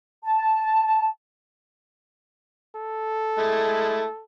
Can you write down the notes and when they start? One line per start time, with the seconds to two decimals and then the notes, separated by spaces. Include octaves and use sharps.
0.24 A5
2.75 A4
3.38 G#3 A3 E4